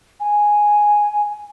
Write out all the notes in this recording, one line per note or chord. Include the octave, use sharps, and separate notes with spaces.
G#5